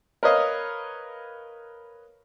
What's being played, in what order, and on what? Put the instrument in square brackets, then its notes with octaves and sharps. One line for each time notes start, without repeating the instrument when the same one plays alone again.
[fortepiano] A#4 B4 C#5 D#5 F5